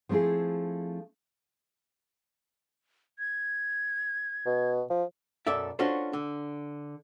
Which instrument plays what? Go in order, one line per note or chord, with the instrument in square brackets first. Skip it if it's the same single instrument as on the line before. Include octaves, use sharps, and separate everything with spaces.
[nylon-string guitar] F3 A3 C4 E4 G#4
[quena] G#6
[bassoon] B2
F3
[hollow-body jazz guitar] B1 F#2 A4 D5 E5
C#4 D4 F4 F#4 A4 C5
D3